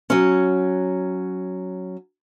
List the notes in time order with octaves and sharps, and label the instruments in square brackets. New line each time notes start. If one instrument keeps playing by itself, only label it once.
[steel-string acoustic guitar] F#3 C#4